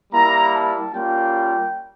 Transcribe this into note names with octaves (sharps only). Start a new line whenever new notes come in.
G3 A#3 E4 A#5
A5
G3 A#3 C#4 F4 G5